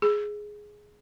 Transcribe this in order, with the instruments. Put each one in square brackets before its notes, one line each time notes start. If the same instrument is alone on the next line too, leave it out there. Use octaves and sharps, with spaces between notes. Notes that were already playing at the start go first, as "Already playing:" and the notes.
[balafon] G#4